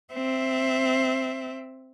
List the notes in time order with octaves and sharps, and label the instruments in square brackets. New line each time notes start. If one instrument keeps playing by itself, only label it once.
[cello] C4 E5